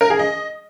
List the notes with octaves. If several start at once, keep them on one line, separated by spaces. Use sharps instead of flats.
A#4
G#4
D#5